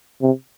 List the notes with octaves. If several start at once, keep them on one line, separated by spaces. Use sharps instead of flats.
C3